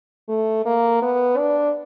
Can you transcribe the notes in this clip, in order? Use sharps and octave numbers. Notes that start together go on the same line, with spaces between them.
A3
A#3
B3
D4